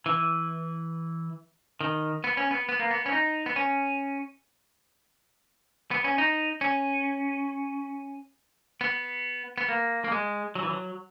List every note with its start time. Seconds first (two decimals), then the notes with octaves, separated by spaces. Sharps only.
0.06 E3
1.81 D#3
2.24 B3
2.37 C#4
2.51 B3
2.69 B3
2.80 A#3
2.91 B3
3.06 C#4
3.12 D#4
3.46 B3
3.56 C#4
5.91 B3
6.04 C#4
6.18 D#4
6.61 C#4
8.81 B3
9.58 B3
9.69 A#3
10.04 A#3
10.12 G#3
10.55 F#3
10.63 E3
10.70 F#3